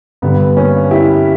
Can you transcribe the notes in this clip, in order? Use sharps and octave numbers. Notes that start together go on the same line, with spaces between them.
G2 D3 G3 B3
A#3 C#4
E4 G4